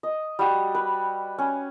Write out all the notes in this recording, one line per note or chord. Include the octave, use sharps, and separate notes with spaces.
D#5
G3 F#4
B4
C#4